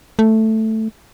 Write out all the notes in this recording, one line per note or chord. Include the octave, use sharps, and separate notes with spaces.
A3